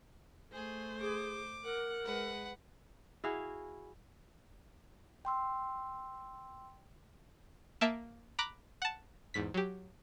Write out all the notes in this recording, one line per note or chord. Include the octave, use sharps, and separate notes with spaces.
A3 G#4 C5
G#4 D6
A#4 F#5
G#3 B4 F#5
E4 F#4 G#4 F5
G5 C6 E6
A#3 E5 A5 D7
A#5 B5 D6 F#6 A#6
F#5 A5
E2 G#2 B6
F#3 G4